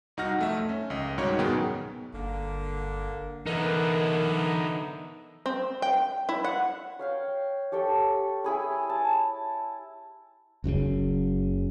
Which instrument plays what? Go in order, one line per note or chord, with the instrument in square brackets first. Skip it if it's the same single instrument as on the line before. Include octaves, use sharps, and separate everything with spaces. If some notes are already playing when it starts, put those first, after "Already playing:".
[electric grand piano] C2 D#4 F#4 F#5 F6 A#6
F2 A3 E5
C#4
C#2 D#5
C2 G#2 D#3 F#4 C#5
F#2 B2 D#3 B3 G#4 G5
[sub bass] G1 [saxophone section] D3 A#3
[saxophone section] D3 B3 E5 [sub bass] E3 [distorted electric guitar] D#4 B4 [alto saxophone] A#4
[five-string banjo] C4
G5
E4
F#5
[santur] C#5 F5 G5
G4 A4 C#5 G5
E4 G#4 B5
A5
[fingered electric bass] F#1 F#2 A2 C#3